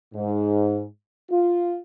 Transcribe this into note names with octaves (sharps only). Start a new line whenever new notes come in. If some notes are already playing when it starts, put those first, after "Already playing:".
G#2
F4